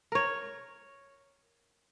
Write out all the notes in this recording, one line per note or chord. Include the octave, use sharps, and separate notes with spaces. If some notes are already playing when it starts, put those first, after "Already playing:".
A#4 C#5